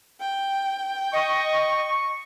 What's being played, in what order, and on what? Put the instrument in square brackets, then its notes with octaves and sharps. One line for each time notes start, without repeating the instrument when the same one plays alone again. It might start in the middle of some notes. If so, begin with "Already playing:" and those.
[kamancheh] G5
[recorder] D#5 [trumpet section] C#6